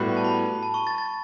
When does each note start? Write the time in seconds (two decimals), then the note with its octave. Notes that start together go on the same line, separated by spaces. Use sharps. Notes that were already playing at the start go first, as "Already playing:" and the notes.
Already playing: A2 G3 B3 F#4
0.08 B5
0.17 A5
0.24 B5
0.63 A5
0.74 C#6
0.87 A6
0.98 A6